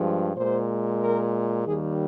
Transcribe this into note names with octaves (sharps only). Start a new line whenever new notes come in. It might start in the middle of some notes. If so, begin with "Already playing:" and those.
Already playing: G2 F3 G#3
A#2 G#3 C5
A#4
D#2 D#3 G3 G#4